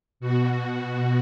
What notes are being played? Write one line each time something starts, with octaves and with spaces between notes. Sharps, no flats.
B2 F#4